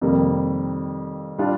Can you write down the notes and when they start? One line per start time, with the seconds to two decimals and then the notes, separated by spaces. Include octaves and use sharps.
0.01 F2 C3 D#3 G3 A#3
1.38 G3 D4 F4